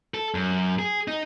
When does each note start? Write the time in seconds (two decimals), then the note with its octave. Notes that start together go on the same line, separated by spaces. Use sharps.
0.14 A4
0.34 F#2
0.79 G#4
1.08 D#4